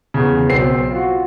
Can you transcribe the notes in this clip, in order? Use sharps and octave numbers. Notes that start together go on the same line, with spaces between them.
E2 C#3
B1 C4 C7
F4 F#4